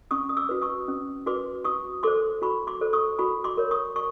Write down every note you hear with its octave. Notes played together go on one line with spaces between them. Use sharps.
C#4 C#6 D#6
D#6
D6 E6
F#4 B4
C#6 D#6
C#4
F#4 B4 C6 D6
F#4 C#6 D#6
A4 C5 C6 D6
F#4 B5 C#6
C6 D6
A4 C5
C#6 D#6
F#4 B5 C#6
C6 D6
A#4 C#5
C#6 D#6
C#6